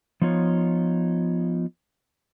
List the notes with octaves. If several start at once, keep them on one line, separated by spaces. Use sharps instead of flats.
F3 B3 D#4 F4 C#5